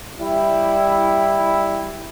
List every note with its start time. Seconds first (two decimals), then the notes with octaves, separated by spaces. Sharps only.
0.19 G3 E4